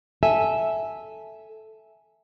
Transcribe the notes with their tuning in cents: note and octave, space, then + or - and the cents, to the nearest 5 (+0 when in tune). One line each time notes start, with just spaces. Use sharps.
A4 -5 E5 -5 G#5 +0